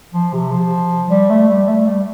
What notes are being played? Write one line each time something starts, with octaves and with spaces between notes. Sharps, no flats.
F3
C3
F3
G3
A3
G3
A3
G3